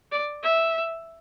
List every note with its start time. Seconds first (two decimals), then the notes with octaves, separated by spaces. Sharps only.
0.12 D5
0.43 E5